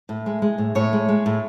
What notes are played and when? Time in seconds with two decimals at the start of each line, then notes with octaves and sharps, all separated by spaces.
0.09 A2
0.26 G#3
0.42 G#3
0.58 A2
0.75 A2 C#5
0.93 G#3
1.09 G#3
1.26 A2